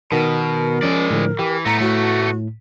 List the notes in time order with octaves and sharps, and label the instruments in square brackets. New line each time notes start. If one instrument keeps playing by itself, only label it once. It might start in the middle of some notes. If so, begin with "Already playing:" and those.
[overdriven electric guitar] B2 [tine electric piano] D#3 B3 F#4 [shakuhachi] A#4
[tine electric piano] F3 C#4 [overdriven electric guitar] G#3 D5
[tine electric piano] A2 D3 F3
[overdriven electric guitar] E3 [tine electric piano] G4
[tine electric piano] A2 A#6 [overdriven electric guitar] A3 B3 [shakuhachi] A#5
[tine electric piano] A2 [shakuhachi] F#4